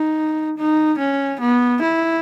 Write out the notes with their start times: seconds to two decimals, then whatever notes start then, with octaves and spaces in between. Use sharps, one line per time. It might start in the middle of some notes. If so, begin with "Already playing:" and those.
Already playing: D#4
0.58 D#4
0.99 C#4
1.40 B3
1.82 E4